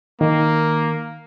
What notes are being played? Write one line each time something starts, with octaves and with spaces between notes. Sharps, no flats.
D#3 A#3